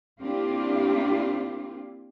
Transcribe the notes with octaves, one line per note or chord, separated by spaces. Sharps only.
A#3 C4 D4 E4 F4 G4